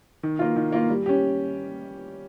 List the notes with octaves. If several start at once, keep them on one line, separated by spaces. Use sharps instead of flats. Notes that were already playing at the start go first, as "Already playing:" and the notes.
D#3
A#3 F4
D#3
A#3 F4
G3
C#4 G4